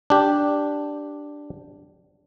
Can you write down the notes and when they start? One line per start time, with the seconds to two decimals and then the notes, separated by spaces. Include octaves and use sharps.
0.10 D4 G4